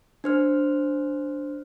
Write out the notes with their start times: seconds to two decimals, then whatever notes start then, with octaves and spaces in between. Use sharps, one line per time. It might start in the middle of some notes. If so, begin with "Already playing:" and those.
0.24 D4 C5 F6